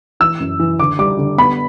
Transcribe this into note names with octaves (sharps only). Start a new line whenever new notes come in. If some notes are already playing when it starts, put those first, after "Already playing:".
E3 E6
F#2
E3
D3 D6
G3 D6
D3
B3 B5